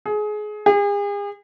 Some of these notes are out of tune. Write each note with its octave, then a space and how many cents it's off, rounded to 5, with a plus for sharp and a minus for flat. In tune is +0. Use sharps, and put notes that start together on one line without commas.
G#4 +25
G#4 -40